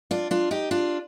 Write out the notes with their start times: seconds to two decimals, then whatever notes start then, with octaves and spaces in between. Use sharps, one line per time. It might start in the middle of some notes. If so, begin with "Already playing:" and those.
0.11 D4 F4
0.31 D4 F4
0.51 D#4 G4
0.71 D4 F4